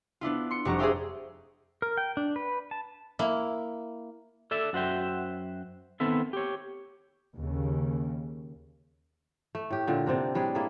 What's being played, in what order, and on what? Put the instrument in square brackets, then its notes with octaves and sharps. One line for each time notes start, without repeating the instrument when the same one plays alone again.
[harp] B3 D4 E4 F4
C6 C#7
F1 G3 F#4 G4 A#5
G#4 C5 D5 E5 F5 G5
[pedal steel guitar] A#4
G5
D4
B4
A5
[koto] A#3 E4
[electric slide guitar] A4 D5 E5
F#2 F#4 C5 E5 G5
D#3 B3 C4 A4 E5
G4 C#5
[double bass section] D#2 C#3
[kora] A3
A2 G4
A#2 D3 F4
C3 C4 D4 A#4
A2 G3 D4 G#4
A#3 E4 G#4 A4